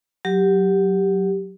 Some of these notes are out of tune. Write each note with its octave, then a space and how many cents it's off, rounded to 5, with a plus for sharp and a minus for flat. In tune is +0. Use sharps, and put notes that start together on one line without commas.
F#3 +0 G4 +0